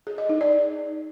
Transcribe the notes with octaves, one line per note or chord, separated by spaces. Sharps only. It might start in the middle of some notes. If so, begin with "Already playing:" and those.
G#4
D#5
D#4
D5